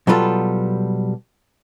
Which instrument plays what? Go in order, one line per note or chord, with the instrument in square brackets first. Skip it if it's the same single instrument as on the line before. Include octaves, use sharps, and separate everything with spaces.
[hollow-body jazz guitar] B2 F#3 G3 B3 F4 A4